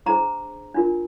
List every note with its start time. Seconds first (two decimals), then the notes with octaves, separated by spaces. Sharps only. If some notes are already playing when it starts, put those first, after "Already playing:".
0.06 D4 G#4 C5 A#5
0.75 D4 F4 A#4